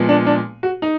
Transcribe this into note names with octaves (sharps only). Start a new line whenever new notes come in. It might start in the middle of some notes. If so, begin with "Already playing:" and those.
Already playing: A#2 F3 G#3 B3
D4
D4
F#4
D#4